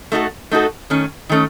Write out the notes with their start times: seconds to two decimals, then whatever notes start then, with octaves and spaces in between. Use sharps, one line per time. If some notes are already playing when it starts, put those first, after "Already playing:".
0.12 A3 D#4 F#4 A4
0.51 A3 D#4 F#4 A4
0.90 D#3 A3 C#4
1.29 D#3 A3 C#4